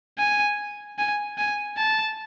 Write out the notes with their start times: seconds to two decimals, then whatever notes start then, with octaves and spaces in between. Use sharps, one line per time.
0.18 G#5
0.99 G#5
1.38 G#5
1.77 A5